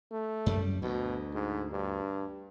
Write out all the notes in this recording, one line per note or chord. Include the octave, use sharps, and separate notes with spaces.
A3
F#2 G3
D2 B2
G#2
G2